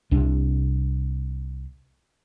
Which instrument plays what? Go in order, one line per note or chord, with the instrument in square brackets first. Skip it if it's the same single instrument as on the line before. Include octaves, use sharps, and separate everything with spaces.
[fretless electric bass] C2 C3 D4